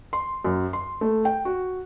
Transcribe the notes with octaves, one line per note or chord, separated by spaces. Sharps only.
C6
F#2
C6
A3
G5
F#4